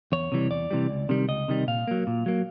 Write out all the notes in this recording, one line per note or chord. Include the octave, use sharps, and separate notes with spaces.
E2 C#5
C3 E3 G3
E2 D5
C3 E3 G3
C#2
C3 D#3 G3
C#2 D#5
C3 D#3 G3
A#2 F5
F#3 A#3
A#2
F#3 A#3